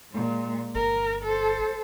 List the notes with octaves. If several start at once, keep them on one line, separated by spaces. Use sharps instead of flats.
A#2 G#3
G1 A#4
A4 C5